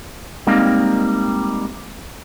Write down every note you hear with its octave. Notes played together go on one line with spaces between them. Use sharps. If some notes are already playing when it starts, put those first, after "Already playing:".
G3 G#3 A#3 C4 D#4